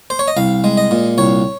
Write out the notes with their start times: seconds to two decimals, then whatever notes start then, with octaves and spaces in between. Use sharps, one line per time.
0.10 C5
0.19 C#5
0.28 D#5
0.37 C2 F5
0.64 G#3
0.77 D#5
0.91 A#2
1.18 C2 C#5